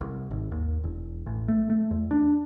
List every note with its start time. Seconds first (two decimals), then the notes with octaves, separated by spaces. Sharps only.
0.01 C2
0.31 G#1
0.52 D#2
0.84 E1
1.26 A1
1.48 A3
1.70 A3
1.91 E2
2.11 D4